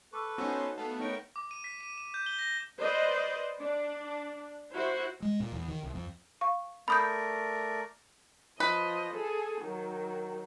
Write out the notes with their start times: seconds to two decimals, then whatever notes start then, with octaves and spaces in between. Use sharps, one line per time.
0.13 A4 B4 C#6 D6 E6
0.38 B3 C#4 D#4 F#4 C5 C#5 G#5 E6
0.78 A3 B3 F5 A5 F#6
1.00 D#4 A#4 C#5 G5 C#6
1.36 D6
1.51 D#7
1.64 B6
1.81 D#7
1.98 E7
2.14 G6
2.26 G7
2.39 A#6
2.80 B4 C5 D5 D#5
3.59 D4
4.73 E4 F#4 C5
5.22 G#3
5.40 A#2
5.52 E2
5.68 D#3
5.83 C2
5.95 F2
6.41 F5 C#6
6.88 A3 A#4 D5 B5 D#6 G6
8.60 F3 B4 D#5
9.13 G#4 A4
9.62 D#3 F#3